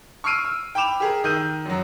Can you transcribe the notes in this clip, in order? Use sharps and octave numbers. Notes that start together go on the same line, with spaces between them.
C#6 E6 F6 C7 D7 D#7
E6
G5 B5 D6 E7 F7
G4 G#4 A#4
D#3 E6 G6 D#7
F#2 F#3